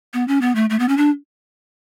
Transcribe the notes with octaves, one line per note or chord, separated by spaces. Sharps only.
B3
C#4
B3
A3
A3
B3
C#4
D4